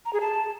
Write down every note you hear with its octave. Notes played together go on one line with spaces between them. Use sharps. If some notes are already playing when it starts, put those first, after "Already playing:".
A#5
G#4
A5